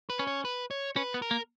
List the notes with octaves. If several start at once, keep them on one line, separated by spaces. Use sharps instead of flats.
B4
C#4
C#5
B4
C#5
C#4 B4
B3
A#4
A#3